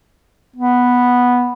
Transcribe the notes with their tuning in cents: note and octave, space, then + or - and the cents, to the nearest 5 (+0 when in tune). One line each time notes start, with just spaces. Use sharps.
B3 -5